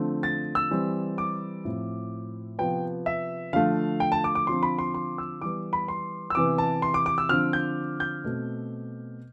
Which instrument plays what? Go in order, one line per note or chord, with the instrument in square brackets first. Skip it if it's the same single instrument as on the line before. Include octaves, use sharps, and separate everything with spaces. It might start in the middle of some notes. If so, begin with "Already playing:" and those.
Already playing: [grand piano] D3 F3 A3 C4
A6
E6
E3 G3 C4
D6
A2 F3 C4
C3 F3 B3 G5
E5
D3 F3 A3 F5
G5
A5
D6
D6
D3 F3 C4 C6
B5
C6
C6
E6
E3 G3 B3 D6
B5
C6
E6
C3 E3 B3 D6
A5
C6
D6
D6
E6
D3 F3 C4 F6
G6
G6
B2 A3 C4